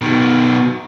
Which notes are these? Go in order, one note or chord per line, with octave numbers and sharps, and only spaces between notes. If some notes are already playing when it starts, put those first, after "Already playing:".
B2 D#3